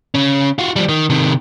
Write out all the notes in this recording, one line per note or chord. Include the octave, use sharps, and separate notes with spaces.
C#3 C#4
F4 F#4
F3 G3
D#3
C3 D#3